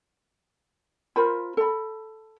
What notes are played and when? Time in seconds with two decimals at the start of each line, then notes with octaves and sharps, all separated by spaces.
1.16 F4 A#4 C5 B5
1.57 A4 B5